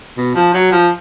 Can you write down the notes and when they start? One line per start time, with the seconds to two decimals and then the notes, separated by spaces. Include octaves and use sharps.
0.17 B2
0.35 F3
0.54 F#3
0.72 F3